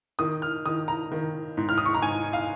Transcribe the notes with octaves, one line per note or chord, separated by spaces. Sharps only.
D#3 D#6
F6
D#3 D#6
A#5
D#3
G#2
F6
D#6
C#6
A#5
G#2 G#5
F5